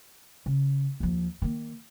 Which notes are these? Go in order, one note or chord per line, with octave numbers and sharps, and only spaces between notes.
C#3
D#2 F3
D#3 A#3